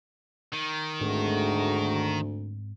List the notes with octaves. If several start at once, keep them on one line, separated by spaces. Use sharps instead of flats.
D#3
D2 G#2 G#3 A3 C4 F#4